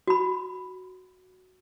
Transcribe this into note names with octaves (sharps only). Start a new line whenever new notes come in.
F#4 B5